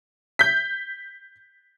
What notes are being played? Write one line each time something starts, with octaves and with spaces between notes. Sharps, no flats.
G6 B6